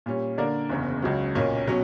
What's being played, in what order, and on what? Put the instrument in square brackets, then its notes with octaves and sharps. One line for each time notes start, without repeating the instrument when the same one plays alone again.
[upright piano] A#2 G3 C#4
D3 A#3 D4 A#4 D5
F#1 E2 C#3
C#2 C#3 F#3
B1 A#2 A#3 C#4
B2 F#3 C#4